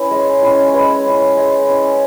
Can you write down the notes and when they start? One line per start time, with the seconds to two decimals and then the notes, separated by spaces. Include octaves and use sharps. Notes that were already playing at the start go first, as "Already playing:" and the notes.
Already playing: C#4 E4 B4
0.11 G#3
0.42 C#4 E4
0.68 C#5
0.74 G#3 B4
1.06 C#4 E4
1.37 G#3
1.69 C#4 E4